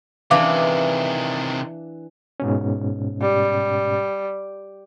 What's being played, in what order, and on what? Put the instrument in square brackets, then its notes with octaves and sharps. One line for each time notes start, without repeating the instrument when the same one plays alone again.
[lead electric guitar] C3 D#3 [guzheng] E3 D4 [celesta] F5 D6
[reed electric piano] G#2 B2 C#4
[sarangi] G3